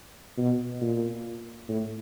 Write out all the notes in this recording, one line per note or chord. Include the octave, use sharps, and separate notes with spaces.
B2
A#2
A2